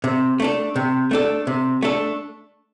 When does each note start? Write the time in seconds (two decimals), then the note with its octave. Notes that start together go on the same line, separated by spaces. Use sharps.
0.04 C3
0.40 A3 D4 A4
0.76 C3
1.11 A3 D4 A4
1.47 C3
1.83 A3 D4 A4